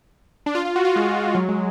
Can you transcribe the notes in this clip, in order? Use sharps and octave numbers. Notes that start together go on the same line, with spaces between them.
D4
F4
F4
F#4
F4
G#3
F#3
G#3